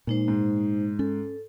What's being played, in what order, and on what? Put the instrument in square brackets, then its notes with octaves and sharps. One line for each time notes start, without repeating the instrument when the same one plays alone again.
[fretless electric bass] A#2 [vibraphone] G#3 D#4 C5
[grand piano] G#2
[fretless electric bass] C#4 [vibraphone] A4